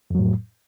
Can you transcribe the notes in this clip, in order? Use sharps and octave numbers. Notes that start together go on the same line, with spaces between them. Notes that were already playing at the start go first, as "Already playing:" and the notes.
F2 A2 F#3